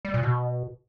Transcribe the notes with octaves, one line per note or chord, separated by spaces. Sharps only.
G3
A#2
B2